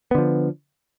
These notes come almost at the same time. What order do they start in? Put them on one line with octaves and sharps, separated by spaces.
B3 D3 F3